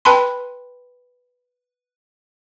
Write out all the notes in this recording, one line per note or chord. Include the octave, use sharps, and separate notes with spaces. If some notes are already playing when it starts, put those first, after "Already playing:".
B4 G5 A5 B5 C6